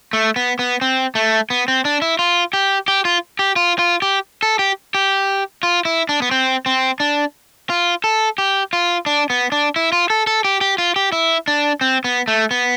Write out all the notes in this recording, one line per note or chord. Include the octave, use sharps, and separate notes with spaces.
A3
B3
B3
C4
A3
B3
C4
D4
E4
F4
G4
G4
F4
G4
F4
F4
G4
A4
G4
G4
F4
E4
D4
B3
C4
C4
D4
F4
A4
G4
F4
D4
B3
D4
E4
F4
A4
A4
G4
G4
F4
G4
E4
D4
C4
B3
A3
B3